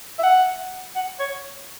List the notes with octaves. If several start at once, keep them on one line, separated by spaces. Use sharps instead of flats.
E5
F#5
F#5
C#5